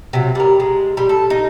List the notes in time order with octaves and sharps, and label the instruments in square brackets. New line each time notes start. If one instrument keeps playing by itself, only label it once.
[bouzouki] C3 F#3
G3 A#4
G#3
G3
A4
D#4